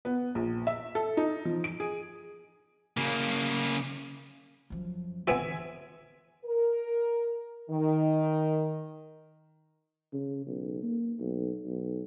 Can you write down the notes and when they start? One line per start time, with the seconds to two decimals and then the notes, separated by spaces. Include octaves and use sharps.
0.05 B3
0.35 A#1
0.67 E5
0.95 A4
1.17 D#4
1.45 F3
1.64 D7
1.80 G#4
2.97 C#3 A#3
4.70 F#2 F3
5.27 D3 E3 B3 C4 F4 E5 G#5
6.44 A#4
7.70 D#3
10.13 C#3
10.46 B1
10.83 A#3
11.20 B1
11.65 B1